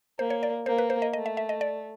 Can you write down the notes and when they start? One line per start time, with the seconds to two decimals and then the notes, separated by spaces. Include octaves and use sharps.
0.19 A#3 C5
0.30 C#5
0.43 D5
0.66 A#3 C5
0.78 B4
0.90 C5
1.02 D#5
1.13 A3 D#5
1.26 E5
1.37 E5
1.49 D#5
1.61 D5